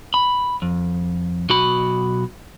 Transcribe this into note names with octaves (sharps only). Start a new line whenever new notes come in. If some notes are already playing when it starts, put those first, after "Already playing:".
B5
F2
B1 F#4 B5